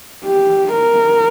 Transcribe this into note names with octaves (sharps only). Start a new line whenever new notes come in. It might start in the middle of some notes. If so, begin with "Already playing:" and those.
G4
A#4